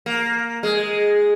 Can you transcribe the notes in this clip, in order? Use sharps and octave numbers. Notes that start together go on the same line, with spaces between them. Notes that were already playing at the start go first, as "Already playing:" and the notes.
A#3
G#3